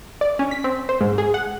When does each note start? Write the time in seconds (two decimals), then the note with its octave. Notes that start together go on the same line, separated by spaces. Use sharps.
0.21 D5
0.39 C#4
0.51 B6
0.64 C4
0.89 C5
1.01 G#2
1.18 G#4
1.34 F#5